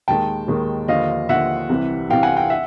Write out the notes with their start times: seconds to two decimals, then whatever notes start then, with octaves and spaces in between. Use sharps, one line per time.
0.08 D#2 D#3 G#3 G5 A5
0.48 D#2 D#3 G#3
0.88 D#2 D3 F3 D#5 F5
1.29 D#2 D3 F3 E5 F#5
1.69 C2 C3 E3
2.09 C2 C3 E3 F5 G5
2.23 F#5 G#5
2.36 F5 G5
2.50 E5 F#5